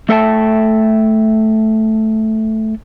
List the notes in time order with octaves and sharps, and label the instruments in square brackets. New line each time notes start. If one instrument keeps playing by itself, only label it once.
[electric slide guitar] A3 A4 E5 G5 A5